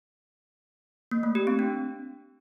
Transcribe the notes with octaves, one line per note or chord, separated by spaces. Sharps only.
A#3
A3
G4
C4
D4